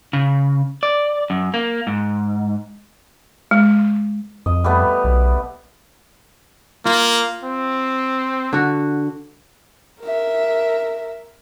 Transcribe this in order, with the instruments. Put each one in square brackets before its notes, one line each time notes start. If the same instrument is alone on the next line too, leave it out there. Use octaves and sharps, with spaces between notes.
[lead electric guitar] C#3
D5
F#2
A#3
G#2
[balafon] G#3
[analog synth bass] F2 [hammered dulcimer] D#5
[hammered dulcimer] G3 A3 B3
[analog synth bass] B1
[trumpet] A#3 [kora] F4
[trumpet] C4
[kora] D3 F#4
[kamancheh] A#4 E5